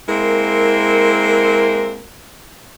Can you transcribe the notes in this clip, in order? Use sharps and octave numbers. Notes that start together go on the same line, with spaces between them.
G#3 A#3 C4 E4 A#4